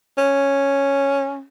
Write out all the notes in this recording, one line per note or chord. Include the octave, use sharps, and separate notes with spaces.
C#4